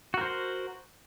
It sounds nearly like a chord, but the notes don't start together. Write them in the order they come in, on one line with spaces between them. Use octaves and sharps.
F#4 A#4 C5